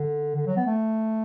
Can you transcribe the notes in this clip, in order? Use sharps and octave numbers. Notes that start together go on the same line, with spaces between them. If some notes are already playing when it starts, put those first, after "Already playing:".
Already playing: D3
D3
F#3
B3
A3